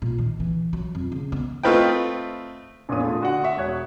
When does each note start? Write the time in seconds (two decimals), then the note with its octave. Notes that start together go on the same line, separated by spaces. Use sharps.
0.02 A#2
0.18 D#3
0.40 E3
0.73 F#3
0.95 F2
1.12 C#3
1.32 B3
1.63 A3 C4 F4 B4 D#5 G5
2.89 A#1 E2 A#2 C#5 D#6
3.02 A3 F4
3.20 D3 F#4 F#5
3.44 E5 C#6
3.57 E1 C#5 F#6